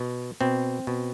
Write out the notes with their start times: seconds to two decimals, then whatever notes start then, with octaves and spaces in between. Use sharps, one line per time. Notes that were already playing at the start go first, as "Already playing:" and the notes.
Already playing: B2
0.41 B2 C4
0.87 B2